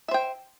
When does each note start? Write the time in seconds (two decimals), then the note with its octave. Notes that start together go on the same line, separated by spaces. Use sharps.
0.08 E5
0.11 C5
0.14 G5